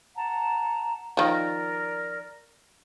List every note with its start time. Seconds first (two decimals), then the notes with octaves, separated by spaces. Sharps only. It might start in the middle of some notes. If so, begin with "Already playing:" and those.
0.15 F#5 A5 A#5
1.17 D#3 F3 A#4 D5